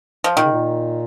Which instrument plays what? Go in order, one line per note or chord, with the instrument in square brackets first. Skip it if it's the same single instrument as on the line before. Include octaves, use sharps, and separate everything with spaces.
[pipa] F3
[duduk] A#2 [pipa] D#3
[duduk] C#3
A#2